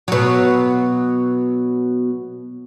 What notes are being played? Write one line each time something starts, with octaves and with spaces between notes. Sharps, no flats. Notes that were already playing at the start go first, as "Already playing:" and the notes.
B2 F#3